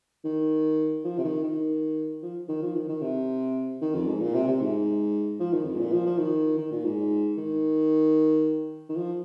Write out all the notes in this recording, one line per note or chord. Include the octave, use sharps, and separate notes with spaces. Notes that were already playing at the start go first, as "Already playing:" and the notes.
D#3
F3
C3
D#3
D#3
F3
D#3
F3
D#3
D#3
C3
D#3
F2
G#2
A#2
C3
C3
G#2
F3
D#3
F2
G#2
A#2
F3
F3
D#3
D#3
A#2
G#2
D#3
D#3
F3